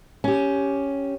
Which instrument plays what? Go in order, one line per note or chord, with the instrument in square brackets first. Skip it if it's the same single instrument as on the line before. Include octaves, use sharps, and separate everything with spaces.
[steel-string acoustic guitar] C#4 G4